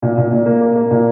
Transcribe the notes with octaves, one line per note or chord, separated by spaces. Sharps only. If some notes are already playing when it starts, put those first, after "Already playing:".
A#2
A#2
A#2
A#3
A#3
A#3
A#2